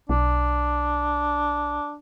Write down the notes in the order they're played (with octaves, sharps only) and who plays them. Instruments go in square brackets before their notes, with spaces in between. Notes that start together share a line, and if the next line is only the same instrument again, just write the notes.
[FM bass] B1 [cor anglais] D4